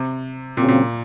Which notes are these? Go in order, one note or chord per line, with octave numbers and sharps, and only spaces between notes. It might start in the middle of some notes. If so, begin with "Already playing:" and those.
Already playing: C3
A#2 C#3 F#3 C4
A#2